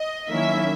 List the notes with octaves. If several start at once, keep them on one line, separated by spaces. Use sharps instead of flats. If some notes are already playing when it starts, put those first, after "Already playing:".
Already playing: D#5
D#3 F#3 A#3 C#4 E4 E5